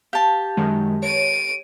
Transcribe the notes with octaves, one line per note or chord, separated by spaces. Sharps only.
G4 F5 A5
F#2 D#3 G#3
C#5 D7 D#7